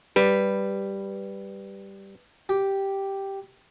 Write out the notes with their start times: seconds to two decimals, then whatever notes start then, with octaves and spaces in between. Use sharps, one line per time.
0.16 G3 B4
2.49 G4